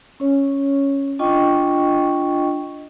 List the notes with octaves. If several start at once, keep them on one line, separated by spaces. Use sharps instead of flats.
C#4 C#5
D4 F4 D#5 G5 C#6